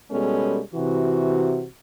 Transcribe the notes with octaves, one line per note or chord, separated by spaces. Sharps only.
B2 G3 G#3 B3 C#4 A4
C3 E3 F#4